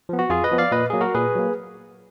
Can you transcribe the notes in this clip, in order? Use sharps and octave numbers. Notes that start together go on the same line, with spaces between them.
F3 B3
F#4
F2 F4 G#4
B4 D#5
F3 B3
D5 F5
A#2 B4 D#5
F#3 A#3 G#4
F#4 A#4
A#2 G#4 B4
F#3 A#3